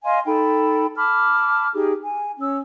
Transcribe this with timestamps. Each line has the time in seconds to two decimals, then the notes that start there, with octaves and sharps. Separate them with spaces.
0.04 D#5 F5 G#5 C6
0.26 D#4 A4 G5 B5
0.96 A5 B5 D6 F6
1.76 D#4 G4 G#4
2.02 G#5
2.38 C#4 E6